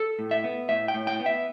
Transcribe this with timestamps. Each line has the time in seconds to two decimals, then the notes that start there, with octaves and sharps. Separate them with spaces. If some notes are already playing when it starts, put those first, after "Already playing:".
Already playing: A4
0.19 A2
0.31 E5
0.44 B3
0.69 A2 E5
0.88 G5
0.94 A2
1.07 G5
1.20 B3
1.26 E5